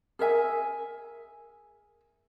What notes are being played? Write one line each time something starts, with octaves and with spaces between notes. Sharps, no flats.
G#4 A#4 E5 G#5